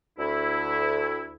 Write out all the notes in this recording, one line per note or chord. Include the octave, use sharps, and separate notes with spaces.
D2 E4